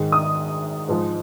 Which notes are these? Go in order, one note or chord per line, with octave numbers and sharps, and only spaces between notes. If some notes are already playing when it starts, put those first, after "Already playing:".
Already playing: G#2 D#3 G#3
D#6
G#2 F3 G#3